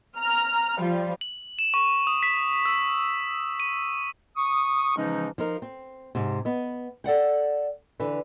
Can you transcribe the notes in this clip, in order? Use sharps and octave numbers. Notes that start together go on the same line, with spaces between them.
A#5 F6
F3 G3 F4
F#7
E7
C#6
D#6
B6
E6
D#7
C#6 D#6
C#3 E3 F3 G#3 C#4 D#4
F3 D#4 A#4
C4
G#2 C3
B3 D#5
A4 D5 F#5 G5
D3 E3 B4